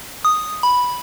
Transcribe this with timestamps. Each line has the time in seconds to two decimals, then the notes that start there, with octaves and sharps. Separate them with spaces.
0.25 D#6
0.63 B5